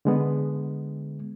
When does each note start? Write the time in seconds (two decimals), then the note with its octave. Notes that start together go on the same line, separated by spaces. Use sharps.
0.05 D3 G#3 B3